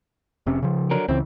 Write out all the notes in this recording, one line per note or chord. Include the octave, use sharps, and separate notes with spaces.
F1 C3 C#4
C#3 F3
D3 F#3 A#4
C#2 C#3 E3 C4